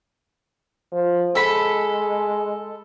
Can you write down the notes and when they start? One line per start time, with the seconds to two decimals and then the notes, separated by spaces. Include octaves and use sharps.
0.92 F3
1.35 G#3 A4 B5